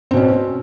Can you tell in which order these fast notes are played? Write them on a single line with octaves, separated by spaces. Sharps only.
C4 B2 C#4